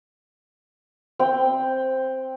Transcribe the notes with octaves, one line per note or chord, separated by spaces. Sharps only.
C4 G5